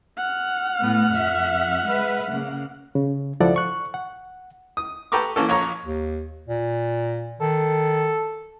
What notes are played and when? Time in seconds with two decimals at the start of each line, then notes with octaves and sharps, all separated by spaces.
0.17 F#5 F6
0.80 A2 B3
1.14 F2 E5
1.86 G#3 B4 E5
2.31 C#3 A#3
2.95 C#3
3.40 C#2 F3 E4 A4 D5 F#5
3.56 C#6 F#6
3.94 F#5
4.77 D#6
5.12 G4 A4 B4 A#5 C#6 D6
5.36 E3 A#3 C#4 A4
5.49 A#1 C#5 A#5 C#6
5.84 D#2
6.48 A#2
7.40 D#3 A4